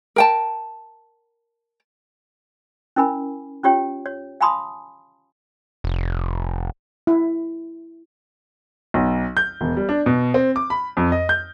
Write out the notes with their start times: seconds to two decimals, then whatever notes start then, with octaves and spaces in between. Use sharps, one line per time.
0.16 A#4 G5 A5
2.96 C#4 E4 A#4 G#5 B5
3.64 C#4 F4 G4 C#5 G5
4.06 C#5
4.41 F5 G#5 A5 B5 C6 D#6
5.84 F1
7.07 E4
8.94 B1
9.37 G6
9.61 E1
9.77 G3
9.89 D4
10.06 B2
10.34 C4
10.56 D6
10.70 B5
10.97 F2
11.12 D#5
11.29 G6